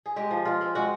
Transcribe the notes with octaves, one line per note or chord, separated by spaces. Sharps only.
G#4
G#3 G4
F3
G#3 F4
C4
G#3 F#4